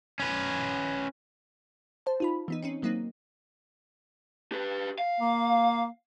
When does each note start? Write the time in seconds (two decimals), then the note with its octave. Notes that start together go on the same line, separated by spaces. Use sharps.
0.20 C#4 B4
2.06 C5 A5
2.20 D#4 F4 B5
2.48 E3 B3 D#4
2.63 C4 C#4 D#4
2.82 D#3 F#3 A#3 C4 D#4
4.52 G4 B4
4.99 F5
5.21 A#3